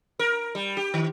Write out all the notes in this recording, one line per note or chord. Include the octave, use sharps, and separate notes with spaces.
A#4
G3
G4
D#3